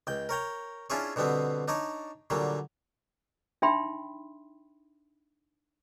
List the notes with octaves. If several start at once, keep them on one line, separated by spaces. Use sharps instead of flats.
C#2 G5
A#4 C#5 G5 A#5
C#4 D4 E4 F4 G#4 C#5
B2 D3 G3 B3 C4
D4 D#4 C#5 D5
A#2 D3 F#3 G3
D4 D#4 E5 G5 B5 C6